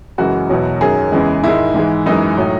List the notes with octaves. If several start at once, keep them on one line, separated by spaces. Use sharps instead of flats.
F#2 C#3 E3 G#3 F#4
E2 B2 F#3
F#2 D#3 F#3 G#4
E2 C#3 E3 G#3
G#2 D#3 G#3 E4
G#2 E3 G#3
F#2 E3 G#3 D#4
A2 F#3